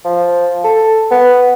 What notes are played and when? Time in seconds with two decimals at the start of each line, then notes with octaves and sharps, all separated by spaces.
0.05 F3
0.64 A4
1.11 B3